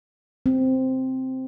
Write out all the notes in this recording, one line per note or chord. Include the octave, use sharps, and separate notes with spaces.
C4